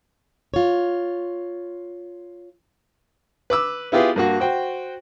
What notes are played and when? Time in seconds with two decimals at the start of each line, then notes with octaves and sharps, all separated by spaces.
0.54 F4 C#5
3.50 B4 D6 E6
3.92 B3 E4 F4 G4 G#4 B4
4.16 G2 A#3 F#4
4.40 F#4 C5 G5